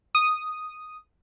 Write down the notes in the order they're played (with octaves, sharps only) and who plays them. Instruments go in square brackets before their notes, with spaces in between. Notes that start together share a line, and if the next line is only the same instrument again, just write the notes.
[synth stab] D#6